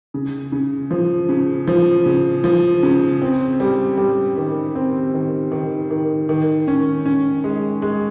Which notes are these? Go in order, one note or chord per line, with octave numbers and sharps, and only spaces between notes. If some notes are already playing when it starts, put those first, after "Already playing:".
C#3
C#3
F3
C#3
F3
C#3
F3
C#3
C4
G3
G3
D#3
C4
D#3
D#3
D#3
D#3
C#4
C#4
G#3
G#3